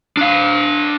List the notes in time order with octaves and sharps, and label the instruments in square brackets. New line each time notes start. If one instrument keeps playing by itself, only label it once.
[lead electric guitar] D4 F5